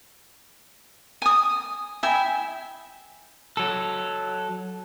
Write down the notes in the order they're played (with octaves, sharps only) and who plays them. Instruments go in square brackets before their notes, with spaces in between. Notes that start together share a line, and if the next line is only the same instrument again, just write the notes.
[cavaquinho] G#5 D#6
E4 E5 G5 G#5
[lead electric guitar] F#3 A4